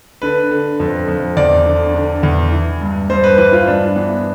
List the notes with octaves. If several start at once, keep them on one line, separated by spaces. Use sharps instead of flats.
D3 B4
D3
F2
F2
E2 D5
D3
D3
E2
E3
G2
G2 C5
B4
E3 B4
F4
G2 D4
E3 B3